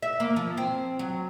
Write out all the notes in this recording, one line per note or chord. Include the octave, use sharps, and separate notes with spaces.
E5
A#3
F3
C4
F#3